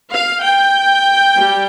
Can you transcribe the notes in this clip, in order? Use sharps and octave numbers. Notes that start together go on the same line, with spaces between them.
F5
G5
G3